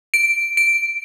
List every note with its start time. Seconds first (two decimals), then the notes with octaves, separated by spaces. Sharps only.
0.14 D7
0.57 D7